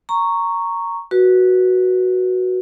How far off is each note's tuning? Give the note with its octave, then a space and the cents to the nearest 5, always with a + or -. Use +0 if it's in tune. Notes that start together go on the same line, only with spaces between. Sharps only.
A#5 -10 C#6 +0
F#4 +0 B4 -25